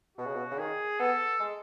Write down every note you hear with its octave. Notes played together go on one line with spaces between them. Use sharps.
B2 F#4
C#3
B2
C#3
D#3 G#4
B3 A4
G#3